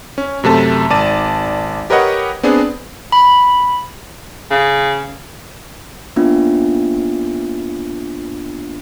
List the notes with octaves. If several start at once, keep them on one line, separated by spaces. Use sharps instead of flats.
C#4
F#2 C3 A3 A5
G#1 D5 A5 D#7
G4 A#4 B4 C#5 D#5 F#5
B3 C4 D4 G#4
B5
C#3
A#3 B3 C#4 D4 F4